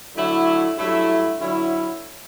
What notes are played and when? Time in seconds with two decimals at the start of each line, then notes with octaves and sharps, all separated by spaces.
0.14 D3 F#3 A3 E4
0.76 G2 F#3 A3 E4
1.39 D3 F#3 C#4 E4